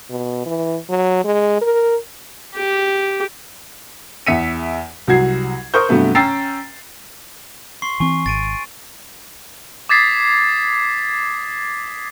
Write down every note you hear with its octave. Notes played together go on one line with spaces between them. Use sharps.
B2
E3
F#3
G#3
A#4
G4
E2 E5 B6 C#7 D#7
C2 F#3 F#4 G#6 C7
A#4 C5 C#6 D#6 G6
G2 C3 F#3 A3 B3
C#4 G5 A#5 E6 A6 C7
C6 C#6 C7
E3 C4 G#5 C#6
G#1 A6 D7 D#7
D6 D#6 G#6 A6 B6 C7